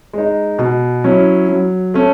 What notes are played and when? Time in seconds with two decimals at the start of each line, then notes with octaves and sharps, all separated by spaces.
0.13 G#3 D#4
0.58 B2
1.04 F#3 C#4 E4
1.49 F#3
1.94 A3 C#4